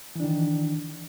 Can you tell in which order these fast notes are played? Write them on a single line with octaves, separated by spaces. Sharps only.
E3 D4 D#3